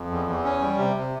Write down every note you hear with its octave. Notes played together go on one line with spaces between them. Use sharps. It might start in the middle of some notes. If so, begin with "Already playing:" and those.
Already playing: F2
E2
E2
C#4
G3
C3
C3